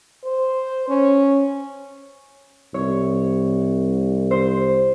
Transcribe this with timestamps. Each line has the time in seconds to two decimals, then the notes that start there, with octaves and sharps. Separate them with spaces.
0.24 C5
0.89 C#4
2.74 C2 C#5
4.31 C5